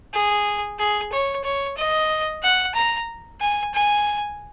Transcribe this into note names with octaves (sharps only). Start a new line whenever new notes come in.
G#4
G#4
C#5
C#5
D#5
F#5
A#5
G#5
G#5